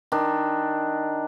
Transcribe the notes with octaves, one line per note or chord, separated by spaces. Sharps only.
D#3 D4